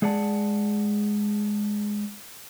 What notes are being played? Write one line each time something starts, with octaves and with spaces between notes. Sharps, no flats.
G#3 G#4 D5 F#5 A5